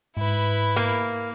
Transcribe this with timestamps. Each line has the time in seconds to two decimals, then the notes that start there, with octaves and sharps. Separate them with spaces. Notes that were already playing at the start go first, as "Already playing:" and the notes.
0.17 G#2 E4 B4
0.76 A#3